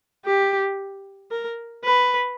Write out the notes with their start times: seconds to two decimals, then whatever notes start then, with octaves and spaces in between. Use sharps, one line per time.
0.25 G4
1.31 A#4
1.85 B4